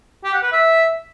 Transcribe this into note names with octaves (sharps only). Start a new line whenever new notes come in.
G4
F#5
B4
E5